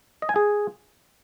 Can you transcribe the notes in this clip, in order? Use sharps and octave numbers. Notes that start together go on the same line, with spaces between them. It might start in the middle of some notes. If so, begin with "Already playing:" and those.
D#5
G#5
G#4